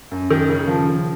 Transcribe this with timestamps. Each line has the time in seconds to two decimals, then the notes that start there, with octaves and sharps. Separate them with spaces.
0.11 F#2
0.30 D#3
0.49 C#3
0.68 F3
0.87 C#3